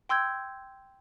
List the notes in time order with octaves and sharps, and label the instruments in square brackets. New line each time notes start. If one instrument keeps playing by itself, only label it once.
[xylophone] G5 C6 E6 G6 G#6